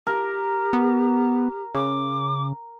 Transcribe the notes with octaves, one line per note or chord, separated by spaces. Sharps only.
G4 A#4
B3
C#3 D6